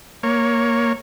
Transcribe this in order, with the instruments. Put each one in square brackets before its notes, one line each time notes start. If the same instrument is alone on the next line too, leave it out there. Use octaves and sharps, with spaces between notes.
[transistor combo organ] A#3 C#5